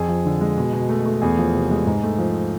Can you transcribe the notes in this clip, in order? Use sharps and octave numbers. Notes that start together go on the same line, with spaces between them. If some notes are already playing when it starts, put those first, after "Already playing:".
Already playing: F2 G#4
F3
D3
G#3
B2
B2
A3
A3
E2 G#4
F3
C3
G#3
G#2
A3
F3